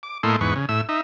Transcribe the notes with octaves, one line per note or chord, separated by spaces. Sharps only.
D6
A2 A3 A#3 E4 D#5 C6
E2 G#2 B4 C#6
C#3
A2 E5 E6
D#4 E5